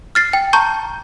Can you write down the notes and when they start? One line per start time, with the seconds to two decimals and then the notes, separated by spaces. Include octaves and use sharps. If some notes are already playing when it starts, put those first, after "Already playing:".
0.15 F6 A6 C7
0.33 G5
0.53 A5 A#5 C#6 G6